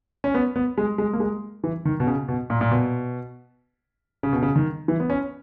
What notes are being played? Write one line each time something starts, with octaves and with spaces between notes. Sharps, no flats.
C#4
B3
B3
G#3
G#3
A#3
G#3
E3
D#3
B2
C#3
B2
A#2
A#2
B2
C#3
B2
C#3
D#3
E3
B3
C#4